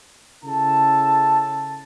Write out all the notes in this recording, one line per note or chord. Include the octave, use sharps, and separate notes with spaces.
C#3 E4 A4 A5